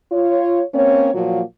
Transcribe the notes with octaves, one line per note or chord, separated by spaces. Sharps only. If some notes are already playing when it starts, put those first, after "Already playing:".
F4 C#5
A#3 C4 C#4 C#5
A#2 F3 F#3 A#3 F4 F#4